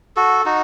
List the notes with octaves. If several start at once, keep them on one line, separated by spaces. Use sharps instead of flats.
F#4 A4
D#4 F#4